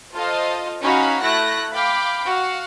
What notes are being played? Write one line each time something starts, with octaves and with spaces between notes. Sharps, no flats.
F4 A4 C5 D#5 F5
C#4 D#4 F#4 C#5 F5 B5
A3 E4 F#6 A#6
F5 G5 B5 D6
F#4 F5